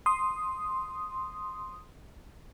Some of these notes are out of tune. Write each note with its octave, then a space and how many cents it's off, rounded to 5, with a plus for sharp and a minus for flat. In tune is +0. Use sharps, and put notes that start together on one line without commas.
C6 +0 D#6 +0